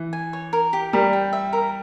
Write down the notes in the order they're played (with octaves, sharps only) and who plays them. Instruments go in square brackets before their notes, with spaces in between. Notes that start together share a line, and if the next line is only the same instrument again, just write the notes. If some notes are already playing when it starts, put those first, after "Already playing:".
Already playing: [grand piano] E3
[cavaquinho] G#5
C#5
A#4
G4
[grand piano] G3 [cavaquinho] A#4
[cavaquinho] G5
E5
A#4